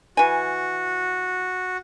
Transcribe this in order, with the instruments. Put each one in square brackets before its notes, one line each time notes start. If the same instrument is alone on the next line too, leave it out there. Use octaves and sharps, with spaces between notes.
[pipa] E3 G#5 [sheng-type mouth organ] F#4